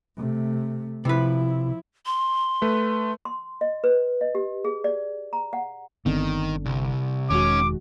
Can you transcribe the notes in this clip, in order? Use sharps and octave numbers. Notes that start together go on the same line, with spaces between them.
C3 A3
C3 F3 E4 B4
C6
A3 B4
C6
D#5
B4
D#5
G4
G#4
D5
A#5
F#5
G1 D3 D#3 B3 C4
C2
E1 D#3 G#3 C#4 F#4 D6